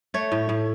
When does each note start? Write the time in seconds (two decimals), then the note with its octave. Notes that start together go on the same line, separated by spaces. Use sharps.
0.14 A3 C#5
0.32 A2
0.49 A2